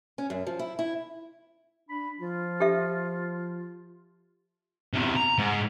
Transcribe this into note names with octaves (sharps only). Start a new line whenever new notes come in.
C#4
F#2
F3
E4
E4
D4 B5
F3 F4
G4 A4 E5
E2 C3
A#5
G#2